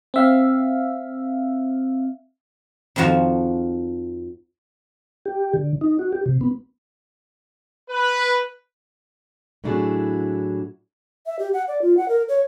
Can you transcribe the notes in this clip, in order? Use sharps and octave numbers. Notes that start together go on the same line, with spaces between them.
C4 E5 F5
F2 D#3 F3 F#4 A5
G4
D3
D#4
F#4
G4
C3
B3
B4
A2 F#3 D4 E4 F#4 G#4
E5
G4
F#5
D5
F4
F#5
A#4
C#5